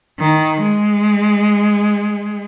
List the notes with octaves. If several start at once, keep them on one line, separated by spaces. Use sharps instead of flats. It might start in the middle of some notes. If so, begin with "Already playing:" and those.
D#3
G#3